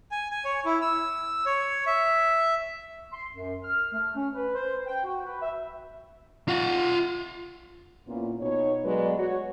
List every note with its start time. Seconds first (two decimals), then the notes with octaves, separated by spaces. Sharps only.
0.11 G#5
0.31 G#5
0.45 C#5
0.65 E4
0.82 E6
1.46 C#5
1.87 E5
3.12 C6
3.33 F#2
3.63 F6
3.93 A3
4.15 C#4
4.34 B4
4.55 C5
4.86 G5
5.04 F#4
5.24 B4
5.42 E5
6.48 F4 F#5
8.08 A#2 B3 C#4 E4 F4
8.41 B2 D#4 C#5
8.85 F#3 G#3 A3 B3 B4 D5
9.19 F#4 C#5